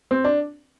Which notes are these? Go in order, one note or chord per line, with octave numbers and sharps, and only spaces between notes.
C4
D4